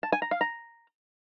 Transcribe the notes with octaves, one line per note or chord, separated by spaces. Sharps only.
A5
G#5
A#5
F5
A#5